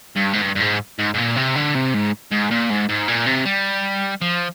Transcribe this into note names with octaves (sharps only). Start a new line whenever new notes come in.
G2
G#2
G2
G2
G#2
G#2
G#2
A#2
C3
D3
C3
G#2
G#2
A#2
G#2
G#2
A#2
C3
G3
F3